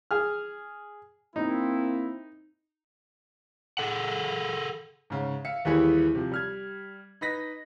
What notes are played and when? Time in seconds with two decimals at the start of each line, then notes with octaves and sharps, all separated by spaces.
0.11 G#4 F6
1.36 A#3 C4 D#4 E4
3.78 G#4 A4 F#5
5.10 G#2 C#3
5.45 E5 F5 C#7
5.65 D#2 E3 G3 E4 G#4 C#7
6.15 C3 F3
6.32 G3 F6 G#6
7.21 D#4 B4 A#6 B6